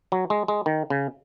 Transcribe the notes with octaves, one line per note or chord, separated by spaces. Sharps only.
F#3
G#3
G#3
D#3
C#3